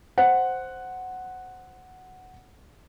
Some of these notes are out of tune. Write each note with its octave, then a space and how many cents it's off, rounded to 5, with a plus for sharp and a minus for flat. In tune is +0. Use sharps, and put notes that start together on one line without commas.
C5 +0 F#5 +0